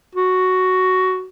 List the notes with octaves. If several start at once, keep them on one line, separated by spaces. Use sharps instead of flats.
F#4